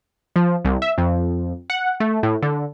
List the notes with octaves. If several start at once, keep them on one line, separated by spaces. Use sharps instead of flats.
F3
C2
E5
F2
F#5
A3
A2
D3